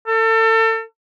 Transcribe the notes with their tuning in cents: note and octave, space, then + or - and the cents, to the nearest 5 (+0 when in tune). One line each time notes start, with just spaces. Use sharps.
A4 +35